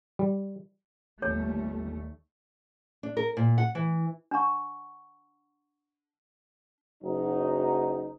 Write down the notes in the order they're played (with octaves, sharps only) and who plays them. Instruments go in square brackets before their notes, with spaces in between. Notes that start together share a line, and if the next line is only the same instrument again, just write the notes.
[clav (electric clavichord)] G3
[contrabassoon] G1 [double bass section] D#2 G3 A3 [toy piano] C#5
[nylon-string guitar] D4
A#4
A#2
F#5
E3
[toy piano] D4 F#5 A#5 C#6
[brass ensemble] F#1 F#3 D#4